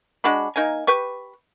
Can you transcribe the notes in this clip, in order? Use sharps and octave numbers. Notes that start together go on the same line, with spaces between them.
G#3 D4 F#4 B5
A#3 D#4 A#4 G#5
G4 B4 C#6